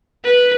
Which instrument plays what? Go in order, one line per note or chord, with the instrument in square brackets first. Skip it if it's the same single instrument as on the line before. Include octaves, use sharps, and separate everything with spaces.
[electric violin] B4